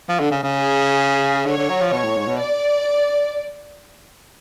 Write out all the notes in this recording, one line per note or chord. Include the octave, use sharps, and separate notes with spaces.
F3
D3
C#3
C#3
G#4
D3 C#5
D3
F#3
F3
B2 C#5
A2
G#2
B2
D5